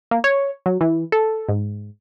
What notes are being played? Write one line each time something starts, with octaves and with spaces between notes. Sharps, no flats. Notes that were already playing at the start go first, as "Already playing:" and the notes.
A#3
C#5
F#3
E3
A4
G#2